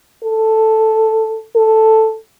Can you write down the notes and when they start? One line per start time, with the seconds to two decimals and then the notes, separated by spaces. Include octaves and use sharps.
0.24 A4
1.56 A4